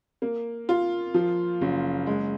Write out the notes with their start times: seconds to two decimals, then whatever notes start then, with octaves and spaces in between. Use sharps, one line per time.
0.22 A#3
0.69 F4
1.14 F3
1.61 F#1
2.06 G#3